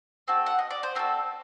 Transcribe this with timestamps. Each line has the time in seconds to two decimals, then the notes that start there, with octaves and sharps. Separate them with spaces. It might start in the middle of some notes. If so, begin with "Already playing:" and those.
0.28 C4 F#4 A4
0.46 F#5
0.59 D#5
0.71 D5
0.83 C5
0.95 C4 F#4 A4 A#4